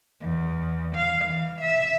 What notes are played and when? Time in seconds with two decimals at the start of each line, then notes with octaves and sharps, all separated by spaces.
0.21 E2
0.96 F5
1.25 E3
1.61 E5